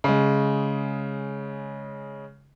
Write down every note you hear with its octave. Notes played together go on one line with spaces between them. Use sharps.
C#3 G#3